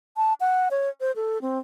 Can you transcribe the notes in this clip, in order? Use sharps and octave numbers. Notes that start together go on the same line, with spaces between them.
A5
F#5
C#5
C5
A4
C4